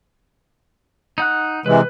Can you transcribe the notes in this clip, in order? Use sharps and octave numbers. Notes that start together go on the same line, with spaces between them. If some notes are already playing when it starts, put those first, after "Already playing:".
D#4 F#5 F#6
C3 E3 G#3 B4